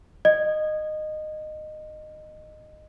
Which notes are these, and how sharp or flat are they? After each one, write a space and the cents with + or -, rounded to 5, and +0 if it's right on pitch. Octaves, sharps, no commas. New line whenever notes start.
D#5 -15